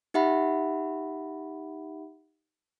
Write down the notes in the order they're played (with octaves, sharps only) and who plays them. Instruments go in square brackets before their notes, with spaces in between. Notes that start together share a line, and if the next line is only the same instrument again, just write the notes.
[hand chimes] D#4 G4 E5 F#5 B5